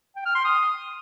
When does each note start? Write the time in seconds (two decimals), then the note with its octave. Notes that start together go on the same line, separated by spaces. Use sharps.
0.16 G5
0.26 F6
0.35 C6
0.45 D#6